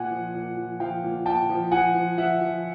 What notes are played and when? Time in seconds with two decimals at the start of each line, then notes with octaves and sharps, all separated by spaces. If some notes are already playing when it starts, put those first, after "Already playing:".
Already playing: A#2 F#5 G#5
0.11 F3
0.34 A#2
0.57 F3
0.80 F3 F5 G5
1.04 A#2
1.26 A#2 G5 A5
1.50 F3
1.72 F3 F#5 G#5
1.95 F3
2.18 F3 E5 F#5
2.41 F3